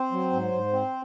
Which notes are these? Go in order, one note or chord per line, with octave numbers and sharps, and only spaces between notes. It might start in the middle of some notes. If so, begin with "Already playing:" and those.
Already playing: C4 C5
F#3
G#2
G#2
C4